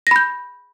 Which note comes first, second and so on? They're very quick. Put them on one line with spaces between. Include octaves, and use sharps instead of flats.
A#6 B5 G6